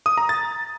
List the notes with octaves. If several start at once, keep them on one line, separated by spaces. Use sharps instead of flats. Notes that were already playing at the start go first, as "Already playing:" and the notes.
D#6
A#5
A6